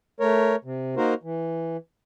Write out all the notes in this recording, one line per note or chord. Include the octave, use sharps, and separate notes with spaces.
A3 A#4 C#5
C3
A#3 D#4 F#4 A#4 C5
E3